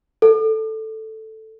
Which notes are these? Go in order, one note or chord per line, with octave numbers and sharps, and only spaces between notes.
A4